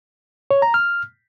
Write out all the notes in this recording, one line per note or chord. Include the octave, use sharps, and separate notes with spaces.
C#5
A#5
F6